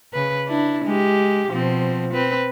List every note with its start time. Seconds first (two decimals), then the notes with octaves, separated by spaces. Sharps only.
0.13 C#3 B4
0.47 D4 E4
0.85 G#3 G4
1.50 B2 F3 C4
2.12 C4 B4